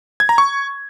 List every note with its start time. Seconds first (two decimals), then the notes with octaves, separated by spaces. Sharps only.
0.20 G#6
0.29 A#5
0.38 C#6